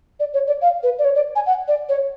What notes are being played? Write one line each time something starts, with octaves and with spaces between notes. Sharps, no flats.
D5
C#5
D5
F5
B4
D5
C#5
D5
G#5
F#5
D5
C#5